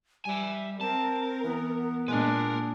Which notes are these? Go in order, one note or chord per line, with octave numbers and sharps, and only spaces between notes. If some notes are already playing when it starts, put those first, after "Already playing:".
G3 E5 G#5
C4 A#4 A5
E3 B3
A#2 G#3 D4 A#4 B4